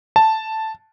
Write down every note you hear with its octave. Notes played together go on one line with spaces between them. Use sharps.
A5